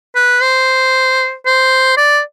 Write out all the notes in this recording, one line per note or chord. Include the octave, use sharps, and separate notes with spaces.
B4
C5
C5
D5